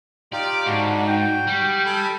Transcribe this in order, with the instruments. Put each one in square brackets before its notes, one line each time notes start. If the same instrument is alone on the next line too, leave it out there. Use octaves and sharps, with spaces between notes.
[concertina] D#4 F4 G4 [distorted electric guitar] D5
[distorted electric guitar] G#2 [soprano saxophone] D4 [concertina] F#4
[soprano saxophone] G5
[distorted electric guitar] G3
[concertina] A4 G#5 B5